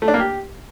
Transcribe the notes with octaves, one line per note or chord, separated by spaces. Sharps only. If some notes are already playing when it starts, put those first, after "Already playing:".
A3
D4
A#3
G4